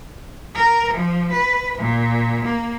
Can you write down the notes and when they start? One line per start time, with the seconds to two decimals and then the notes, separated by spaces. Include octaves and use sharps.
0.55 A#4
0.94 F3
1.32 B4
1.78 A#2
2.45 A#3